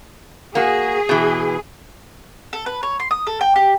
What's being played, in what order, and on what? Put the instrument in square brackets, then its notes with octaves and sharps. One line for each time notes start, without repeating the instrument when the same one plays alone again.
[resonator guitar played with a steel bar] A#3 F#4 [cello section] G#4
[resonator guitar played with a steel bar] B2 E3
[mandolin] A4
B4
C#5
C6
D#6
A4
G5
G4